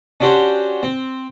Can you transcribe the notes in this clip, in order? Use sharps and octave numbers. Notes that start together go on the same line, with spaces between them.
C#4 D4 F#4 G4 C5 C#5
C4